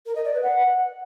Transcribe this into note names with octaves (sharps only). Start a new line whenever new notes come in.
A#4
D#5
D5
B4
F#5